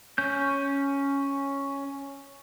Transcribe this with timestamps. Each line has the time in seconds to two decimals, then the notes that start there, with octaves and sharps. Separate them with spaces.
0.18 C#4 G6